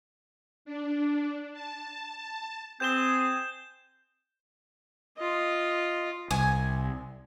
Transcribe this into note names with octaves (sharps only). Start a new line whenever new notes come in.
D4
A5
A5
C4 G#4 G6 E7 G7
F4 D#5
C2 G#5